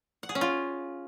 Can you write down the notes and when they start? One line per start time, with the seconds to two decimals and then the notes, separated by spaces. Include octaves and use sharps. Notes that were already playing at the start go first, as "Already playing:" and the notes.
0.23 F#5
0.29 G#4
0.35 C#4
0.41 F4